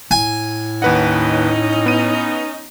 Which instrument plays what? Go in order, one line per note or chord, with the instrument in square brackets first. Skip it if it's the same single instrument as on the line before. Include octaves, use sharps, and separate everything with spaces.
[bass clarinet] A2 [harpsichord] G#5
[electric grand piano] D#2 B4 F#5 [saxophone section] C#4 D#4
[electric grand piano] B3 D#7